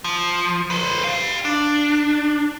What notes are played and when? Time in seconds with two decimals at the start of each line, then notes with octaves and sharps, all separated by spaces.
0.04 F3
0.70 B4 C5
1.04 G4 F5
1.45 D4